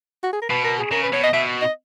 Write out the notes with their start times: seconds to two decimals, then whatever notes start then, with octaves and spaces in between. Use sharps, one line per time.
0.24 F#4
0.33 G#4
0.41 A#4
0.50 B2 B4
0.64 A#4
0.78 G#4
0.92 C#3 A#4
1.03 B4
1.13 B2 C#5
1.23 D#5
1.33 B2 E5
1.62 D#5